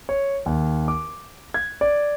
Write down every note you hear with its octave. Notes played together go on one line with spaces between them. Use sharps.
C#5
D#2
D6
G#6
D5